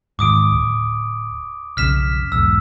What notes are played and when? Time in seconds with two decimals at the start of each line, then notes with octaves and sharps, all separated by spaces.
0.19 G#2 D#3 D6 D#6 D7
0.52 D1
1.77 B1 F2 C#3 F6 B6 E7
2.32 B1 E2 G#2 E6